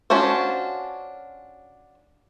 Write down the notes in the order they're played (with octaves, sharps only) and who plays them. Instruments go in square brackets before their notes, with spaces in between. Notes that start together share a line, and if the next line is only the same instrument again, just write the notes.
[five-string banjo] C#4 D4 F4 F#4 C5